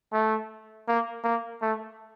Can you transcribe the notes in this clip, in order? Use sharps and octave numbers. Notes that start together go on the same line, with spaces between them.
A3
A#3
A#3
A3